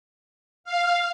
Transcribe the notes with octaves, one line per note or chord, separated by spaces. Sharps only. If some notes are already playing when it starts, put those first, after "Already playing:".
F5